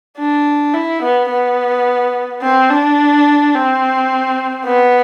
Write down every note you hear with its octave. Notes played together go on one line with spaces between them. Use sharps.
D4
E4
B3
B3
C4
D4
C4
B3